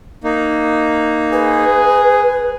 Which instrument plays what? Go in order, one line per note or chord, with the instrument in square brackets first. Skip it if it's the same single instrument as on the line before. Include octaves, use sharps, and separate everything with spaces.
[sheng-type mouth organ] A#3 D#4
[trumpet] G#4 [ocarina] B4